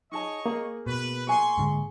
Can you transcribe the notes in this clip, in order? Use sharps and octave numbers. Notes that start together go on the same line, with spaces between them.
D#4 G#4 C#5 D#5 A5 C#6
A#3 G#4
B2 B4
G#4 G#5 C6 C#6
G#2 D3 G#3